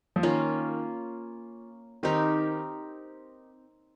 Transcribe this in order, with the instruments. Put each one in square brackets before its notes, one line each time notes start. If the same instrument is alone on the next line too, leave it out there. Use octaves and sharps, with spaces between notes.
[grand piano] F3
[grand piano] D#3 [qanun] A#3 C#4 F4
[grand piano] D#3 [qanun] C4 D#4 G4 A#4